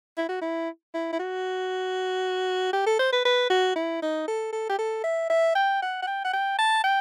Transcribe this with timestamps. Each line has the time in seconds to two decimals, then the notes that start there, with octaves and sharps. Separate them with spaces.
0.17 E4
0.29 F#4
0.41 E4
0.94 E4
1.12 E4
1.19 F#4
2.73 G4
2.86 A4
2.99 C5
3.12 B4
3.25 B4
3.50 F#4
3.76 E4
4.02 D#4
4.28 A4
4.52 A4
4.69 G4
4.78 A4
5.04 E5
5.30 E5
5.55 G5
5.82 F#5
6.02 F#5
6.07 G5
6.25 F#5
6.33 G5
6.59 A5
6.84 G5